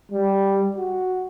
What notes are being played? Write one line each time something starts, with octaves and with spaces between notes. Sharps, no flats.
G3
F#4